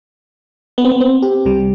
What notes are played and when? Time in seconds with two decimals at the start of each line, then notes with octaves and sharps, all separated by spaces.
0.78 B3
0.85 C4
0.92 B3
1.00 C4
1.22 G4
1.45 C2 C3 G3